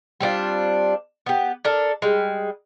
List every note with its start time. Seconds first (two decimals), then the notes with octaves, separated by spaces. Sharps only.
0.20 G3 C4 D4 F4
1.26 B3 G4
1.65 D4 A4 A#4
2.02 G3 G#3